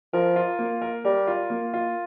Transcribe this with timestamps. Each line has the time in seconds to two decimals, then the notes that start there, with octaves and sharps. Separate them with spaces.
0.13 F3 A#4
0.36 F4
0.59 A#3
0.82 A#4
1.05 G3 A#4
1.27 F4
1.50 A#3
1.74 F4